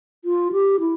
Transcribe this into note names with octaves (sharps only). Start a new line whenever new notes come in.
F4
G4
E4